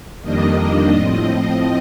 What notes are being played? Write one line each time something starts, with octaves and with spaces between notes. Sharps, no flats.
F2 D#3 G3 A#3 D4 D#5
A2 F3 C4
D#5